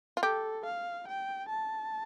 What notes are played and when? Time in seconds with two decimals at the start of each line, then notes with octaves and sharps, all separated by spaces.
0.17 F4
0.23 G4 A4
0.66 F5
1.08 G5
1.49 A5